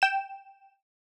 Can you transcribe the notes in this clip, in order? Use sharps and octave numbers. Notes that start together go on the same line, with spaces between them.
G5 E7